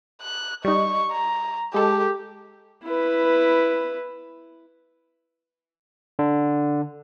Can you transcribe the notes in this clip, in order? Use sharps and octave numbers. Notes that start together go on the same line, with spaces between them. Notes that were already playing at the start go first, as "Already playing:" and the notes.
F#6
G3 D#4 C#6
A#5
G#3 G4 A4
E4 B4
D3